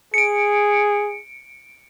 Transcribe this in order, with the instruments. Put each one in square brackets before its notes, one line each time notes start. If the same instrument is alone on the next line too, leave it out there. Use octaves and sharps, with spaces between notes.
[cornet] G#4 [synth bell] C#7 D7